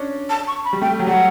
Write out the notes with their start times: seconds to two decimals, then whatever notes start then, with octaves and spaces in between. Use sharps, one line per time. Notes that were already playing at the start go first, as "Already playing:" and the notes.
Already playing: C#4 D4
0.29 A5
0.47 C#6
0.64 B5
0.73 G3
0.81 A3 G5
0.99 F#3
1.07 G3 F#5